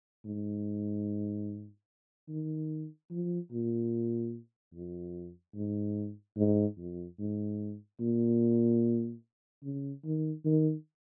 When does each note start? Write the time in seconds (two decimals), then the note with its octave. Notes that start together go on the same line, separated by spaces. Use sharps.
0.25 G#2
2.29 D#3
3.10 F3
3.51 A#2
4.73 F2
5.55 G#2
6.37 G#2
6.77 F2
7.19 G#2
8.00 A#2
9.63 C#3
10.04 D#3
10.45 D#3